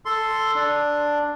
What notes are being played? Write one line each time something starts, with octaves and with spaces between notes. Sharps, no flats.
A4 C6
D4